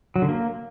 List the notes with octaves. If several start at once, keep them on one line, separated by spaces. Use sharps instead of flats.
F#3
D3
A#3